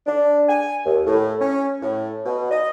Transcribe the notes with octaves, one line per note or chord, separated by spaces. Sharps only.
D4
G#5
D#2
A2
C#4
A2
B2
D#5